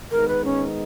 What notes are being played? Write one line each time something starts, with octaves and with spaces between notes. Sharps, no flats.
D#3 G#3 B3 D#4 A#4
B4
C#4